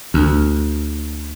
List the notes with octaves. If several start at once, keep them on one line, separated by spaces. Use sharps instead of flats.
D2